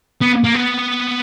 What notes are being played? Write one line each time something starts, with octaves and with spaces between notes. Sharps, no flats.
B3
A#3
B3